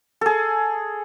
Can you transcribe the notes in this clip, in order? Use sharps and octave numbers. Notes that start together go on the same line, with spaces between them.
G#4 A4